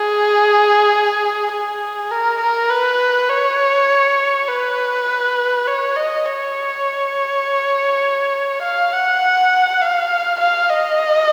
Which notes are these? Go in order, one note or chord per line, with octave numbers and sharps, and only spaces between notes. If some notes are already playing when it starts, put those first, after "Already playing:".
Already playing: G#4
G#4
A#4
A#4
B4
C#5
B4
C#5
D#5
C#5
F5
F#5
F5
F5
D#5